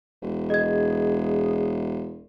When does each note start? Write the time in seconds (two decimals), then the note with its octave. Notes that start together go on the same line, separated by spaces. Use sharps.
0.22 E1
0.50 G#4 D#5 G#6